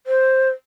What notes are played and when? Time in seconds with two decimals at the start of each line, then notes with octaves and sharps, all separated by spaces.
0.07 C5